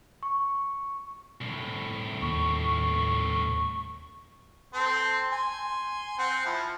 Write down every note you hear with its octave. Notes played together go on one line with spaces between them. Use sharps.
C#6
C2 A2
D#2 C#6
C4 A4 C6
G#5 C6
C4 F#5 G#5
F3 E4